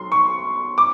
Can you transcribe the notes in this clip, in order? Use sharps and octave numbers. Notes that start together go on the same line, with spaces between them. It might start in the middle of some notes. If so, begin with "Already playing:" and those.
Already playing: B1 C6
C#6
D6